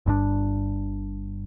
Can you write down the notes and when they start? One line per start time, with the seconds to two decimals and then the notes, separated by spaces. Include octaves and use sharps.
0.06 G1 G2 D3 D4